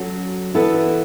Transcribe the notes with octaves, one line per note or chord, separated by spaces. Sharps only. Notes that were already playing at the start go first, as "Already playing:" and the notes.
Already playing: F#3 C#4 F#4 A4
E3 B3 E4 A4